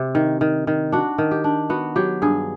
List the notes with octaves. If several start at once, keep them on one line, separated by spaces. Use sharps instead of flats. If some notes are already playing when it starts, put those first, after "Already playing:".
Already playing: C3
D#3
D#3
D#3
D4 F#4
D#3
G4
D4
B3 F#4
F#3 G4
G2 G#4